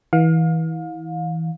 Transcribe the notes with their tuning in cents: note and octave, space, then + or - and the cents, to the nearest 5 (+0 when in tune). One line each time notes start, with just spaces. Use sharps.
E3 -30 F5 +30